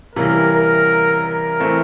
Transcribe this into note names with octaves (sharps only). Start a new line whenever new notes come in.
C3 E3 G3 A#3 C#4 A#4
A#4
A#4
E3 A3 C4